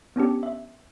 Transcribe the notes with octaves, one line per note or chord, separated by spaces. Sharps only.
B3 C#4 D4 G4
E5